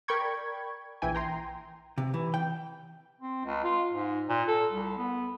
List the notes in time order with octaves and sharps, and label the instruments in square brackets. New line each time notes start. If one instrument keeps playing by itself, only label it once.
[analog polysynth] A#4 D5 G5 B5 C#6 G#6
A#1 E3 G5 G#5
G5 A#5 C6
[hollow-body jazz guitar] C3
E3
G5
[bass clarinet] C4
C#2
F4
G#2
A#2
A4
C2
B3